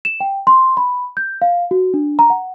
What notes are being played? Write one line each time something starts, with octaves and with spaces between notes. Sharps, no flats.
E7
G5
C6
B5
G6
F5
F#4
D4
A#5
F#5